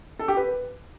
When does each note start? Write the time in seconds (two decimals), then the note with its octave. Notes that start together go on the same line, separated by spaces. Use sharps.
0.19 A4
0.28 G4
0.37 B4